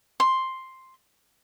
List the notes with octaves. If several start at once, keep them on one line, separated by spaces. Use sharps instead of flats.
C6